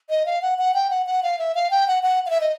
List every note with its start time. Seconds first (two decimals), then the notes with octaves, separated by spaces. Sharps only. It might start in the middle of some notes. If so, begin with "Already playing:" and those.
0.10 D#5
0.26 F5
0.42 F#5
0.58 F#5
0.74 G5
0.90 F#5
1.06 F#5
1.23 F5
1.39 E5
1.55 F5
1.71 G5
1.87 F#5
2.03 F#5
2.26 F5
2.30 E5
2.41 D#5